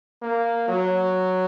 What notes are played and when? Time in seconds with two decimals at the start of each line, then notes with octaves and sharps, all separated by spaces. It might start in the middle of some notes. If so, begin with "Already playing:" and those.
0.22 A#3
0.68 F#3